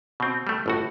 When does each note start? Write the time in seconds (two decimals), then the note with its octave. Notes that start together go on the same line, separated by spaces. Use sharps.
0.20 B2 C4
0.47 G3 A3
0.66 G1 A2 F#4